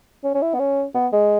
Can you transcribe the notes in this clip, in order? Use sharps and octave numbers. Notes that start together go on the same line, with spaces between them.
C#4
C#4
E4
B3
C#4
B3
G#3